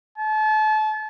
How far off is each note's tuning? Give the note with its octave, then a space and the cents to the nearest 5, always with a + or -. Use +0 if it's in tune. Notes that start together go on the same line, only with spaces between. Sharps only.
A5 -35